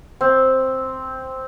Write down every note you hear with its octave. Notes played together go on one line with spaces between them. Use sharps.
C4